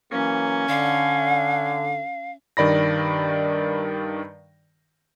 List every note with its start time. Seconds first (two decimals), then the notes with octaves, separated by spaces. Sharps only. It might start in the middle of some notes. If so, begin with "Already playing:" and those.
0.12 E3 F#3 A#3 C#4
0.69 D3 F5
2.57 G2 D#3 D5 B5 A#6